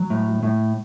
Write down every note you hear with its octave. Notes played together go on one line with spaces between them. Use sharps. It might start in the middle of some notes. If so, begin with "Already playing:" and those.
Already playing: F#3
A2
A2